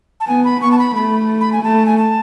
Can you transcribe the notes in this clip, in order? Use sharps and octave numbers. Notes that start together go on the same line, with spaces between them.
A5
B3 G#5
B5
B3 C#6
A5
B5
A3 B5
B5
G#5
A3 A5
G#5
A5